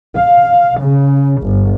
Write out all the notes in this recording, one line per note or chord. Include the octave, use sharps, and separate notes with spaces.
F5
C#3
G1